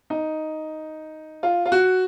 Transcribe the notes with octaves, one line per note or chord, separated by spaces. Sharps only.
D#4
F4
F4
F#4